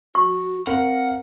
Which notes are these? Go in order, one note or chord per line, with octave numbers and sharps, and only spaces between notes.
F#4 C#6
C4 A#4 F5 F#5